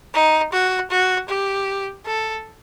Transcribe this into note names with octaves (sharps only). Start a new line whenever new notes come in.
D#4
F#4
F#4
G4
A4